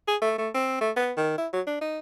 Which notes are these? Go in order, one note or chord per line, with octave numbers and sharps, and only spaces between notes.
G#4
A3
A3
C4
A3
B3
D#3
E4
F#3
D4
D#4